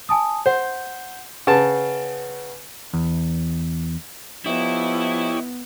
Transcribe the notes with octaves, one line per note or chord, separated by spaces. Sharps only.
G#5 A5 D#6
C5 F#5 G6
C#3 B4 F#5 A5
E2
F3 B3 E4 G4 C#5 D#5